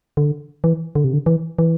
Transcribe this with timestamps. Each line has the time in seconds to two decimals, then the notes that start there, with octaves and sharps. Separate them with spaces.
0.17 D3
0.64 E3
0.95 D3
1.04 C3
1.13 D3
1.26 E3
1.59 E3